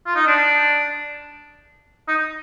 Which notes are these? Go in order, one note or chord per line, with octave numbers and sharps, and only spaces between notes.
F4
D#4
D4
D#4